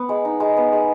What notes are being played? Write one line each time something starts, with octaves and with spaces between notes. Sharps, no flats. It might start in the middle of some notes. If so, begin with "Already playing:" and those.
Already playing: B3 F#5
G#3
D#4
G#3
B3
G#3